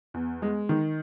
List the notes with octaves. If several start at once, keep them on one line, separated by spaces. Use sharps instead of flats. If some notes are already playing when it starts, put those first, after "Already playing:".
E2
G#3
D#3